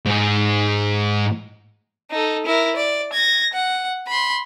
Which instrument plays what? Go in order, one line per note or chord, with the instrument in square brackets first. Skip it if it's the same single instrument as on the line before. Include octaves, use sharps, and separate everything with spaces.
[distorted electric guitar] G#2 G#4
[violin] D#4 A4
E4 A#4
D5
G#6 A#6
F#5
B5 C6